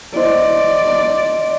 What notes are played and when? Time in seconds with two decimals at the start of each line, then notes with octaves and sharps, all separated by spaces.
0.16 E4 C5 D5 D#5 C6